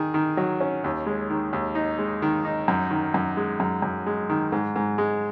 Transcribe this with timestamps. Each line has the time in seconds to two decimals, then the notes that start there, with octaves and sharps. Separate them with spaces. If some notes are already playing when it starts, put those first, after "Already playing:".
Already playing: D#3 G#4
0.14 D#3
0.37 F#3
0.60 C#4
0.84 D#2
1.06 G#3
1.30 D#3
1.53 D#2
1.75 D#4
1.98 G#3
2.22 D#3
2.45 D#4
2.68 F#2
2.91 D#3
3.14 F#2
3.37 G#3
3.60 F#2
3.82 F#2
4.06 G#3
4.30 D#3
4.52 G#2
4.76 G#2
4.98 G#3